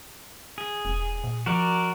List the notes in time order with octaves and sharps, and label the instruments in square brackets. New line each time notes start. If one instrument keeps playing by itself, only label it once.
[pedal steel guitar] G#4
[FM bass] E1
A#2
[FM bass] F3 [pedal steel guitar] F#4 A#4 D5